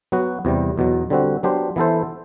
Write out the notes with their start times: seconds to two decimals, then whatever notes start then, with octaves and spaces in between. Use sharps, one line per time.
0.12 F#3 B3 F#4
0.45 E2 C3 G3
0.78 E2 B2 F#3
1.10 D3 G3 C4 F#4
1.43 F#3 B3 D4 G4 C5
1.76 E3 B3 E4 A4 C5